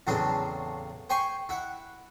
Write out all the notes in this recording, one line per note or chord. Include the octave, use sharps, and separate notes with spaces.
E2 A2 C#3 F#3 C4 D4
C5 G5 G#5 C6 C#6
E4 F#5